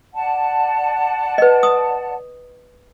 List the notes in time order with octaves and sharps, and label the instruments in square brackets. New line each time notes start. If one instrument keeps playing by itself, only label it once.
[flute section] D5 F#5 A5
[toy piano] B4 D#5
D#6